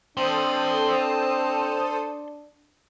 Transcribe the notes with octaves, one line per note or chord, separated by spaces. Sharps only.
C4 D4 A4 C5 A5 C6 D#6